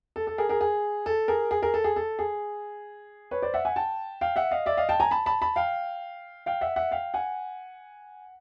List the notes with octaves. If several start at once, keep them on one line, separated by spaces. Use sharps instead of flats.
A4
A4
G#4 A#4
G#4 A#4
G#4
A4
G#4 A#4
G#4
G#4 A#4
A4
G#4
A4
G#4
B4 C#5
C5 D5
E5 F#5
F#5 G#5
G5 A5
F5 G5
E5 F#5
D#5 F5
D5 E5
D#5 F5
G5 A5
G#5 A#5
A5 B5
A5 B5
A5 B5
F5 G5
F5 G5
E5 F#5
E5 F#5
F5 G5
F#5 G#5